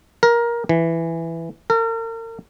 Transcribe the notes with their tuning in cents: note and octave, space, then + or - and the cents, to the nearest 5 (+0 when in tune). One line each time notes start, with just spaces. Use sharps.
A#4 +15
E3 +5
A#4 -40